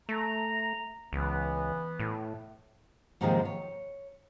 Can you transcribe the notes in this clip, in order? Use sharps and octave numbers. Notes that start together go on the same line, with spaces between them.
A3 A#5
C#2 E3 B3
A2
G#2 C3 D#3 F3 G#3 A#3
C#5